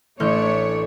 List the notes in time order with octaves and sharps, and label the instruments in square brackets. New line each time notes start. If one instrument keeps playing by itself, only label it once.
[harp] A1 F6 G6 [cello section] A3 D4 C#5